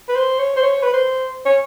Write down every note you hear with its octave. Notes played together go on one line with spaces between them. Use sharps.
B4
C5
C#5
C5
C#5
B4
C5
C#5